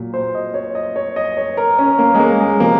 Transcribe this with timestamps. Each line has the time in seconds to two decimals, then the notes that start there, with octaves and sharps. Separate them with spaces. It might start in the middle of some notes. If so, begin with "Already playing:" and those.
Already playing: A#2 F#3
0.14 C5
0.35 D#5
0.54 C#5
0.75 D#5
0.96 C#5
1.16 D#5
1.37 C#5
1.57 A#4
1.79 C#4
1.99 A#3
2.15 G#3
2.20 A#3
2.40 G#3
2.60 C3 F3 G#3 A#3